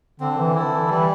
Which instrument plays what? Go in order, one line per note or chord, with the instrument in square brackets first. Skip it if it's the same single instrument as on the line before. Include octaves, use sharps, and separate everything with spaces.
[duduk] D3 [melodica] C4
[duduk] E3
[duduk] D3 [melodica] E4 A4
[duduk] E3
[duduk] E3 [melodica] G3